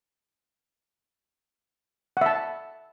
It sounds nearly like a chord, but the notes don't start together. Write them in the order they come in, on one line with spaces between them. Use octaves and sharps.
F#5 E5 A5